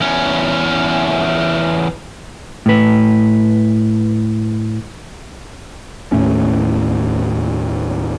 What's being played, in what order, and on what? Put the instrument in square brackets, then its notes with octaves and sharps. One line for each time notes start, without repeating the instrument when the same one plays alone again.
[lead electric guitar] E2 C#4
[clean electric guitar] A2 B4
[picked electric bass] D#2 A2 A3 C#4